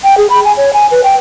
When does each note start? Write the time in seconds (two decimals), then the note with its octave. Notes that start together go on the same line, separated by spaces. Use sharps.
0.04 G5
0.17 G#4
0.30 B5
0.45 G#5
0.57 C#5
0.73 G#5
0.91 B4
1.04 G5